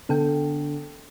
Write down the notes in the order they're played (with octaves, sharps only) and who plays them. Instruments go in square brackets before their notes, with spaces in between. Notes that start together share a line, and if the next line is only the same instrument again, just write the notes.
[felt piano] D3 [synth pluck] B3 A4 G5